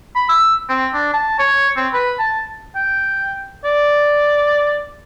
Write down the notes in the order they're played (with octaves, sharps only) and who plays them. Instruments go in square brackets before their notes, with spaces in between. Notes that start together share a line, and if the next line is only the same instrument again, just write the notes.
[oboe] B5
E6
C4
D4
A5
C#5
C4
B4
A5
G5
D5